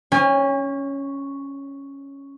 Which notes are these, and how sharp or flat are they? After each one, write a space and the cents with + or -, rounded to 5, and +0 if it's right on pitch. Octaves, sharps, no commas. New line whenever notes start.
C#4 +0 G#5 -40